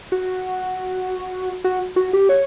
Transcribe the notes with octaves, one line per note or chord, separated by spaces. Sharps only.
F#4
F#4
F#4
G4
C#5